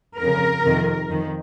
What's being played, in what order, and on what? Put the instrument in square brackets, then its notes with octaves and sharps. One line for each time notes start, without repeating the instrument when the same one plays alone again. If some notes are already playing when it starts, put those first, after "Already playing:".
[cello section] F2 C#3 A#4
F2 C3 D#3
F2 D#3